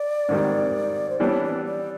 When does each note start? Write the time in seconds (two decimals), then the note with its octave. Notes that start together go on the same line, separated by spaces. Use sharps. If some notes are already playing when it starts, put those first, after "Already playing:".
Already playing: D5
0.28 G#2 D#3 G3
1.10 C5
1.20 E3 G3 B3 D4 C#5
1.44 D5
1.65 D5